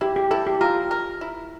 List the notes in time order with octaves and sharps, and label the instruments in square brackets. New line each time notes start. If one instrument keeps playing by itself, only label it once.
[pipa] E4 [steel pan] G4
[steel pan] G4
[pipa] E4 [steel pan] A4
[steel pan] G4
[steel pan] F4 [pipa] A#4
[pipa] A#4
E4